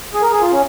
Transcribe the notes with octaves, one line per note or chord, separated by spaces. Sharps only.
G#4
A#4
G#4
F4
C#4